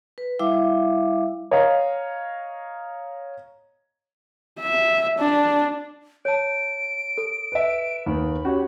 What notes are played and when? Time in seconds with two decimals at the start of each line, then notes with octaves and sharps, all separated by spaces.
0.18 B4
0.39 G3 E4 E5 F5 D6
1.51 C#5 D#5 F5 A#5
4.60 E5
5.19 D4
6.25 C#5 A5 D7
7.18 A4
7.52 B4 E5
8.06 D#2 D#3 B3 B5
8.45 C#4 F#4 G4 C#5